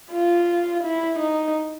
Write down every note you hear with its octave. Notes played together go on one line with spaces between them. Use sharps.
F4
E4
D#4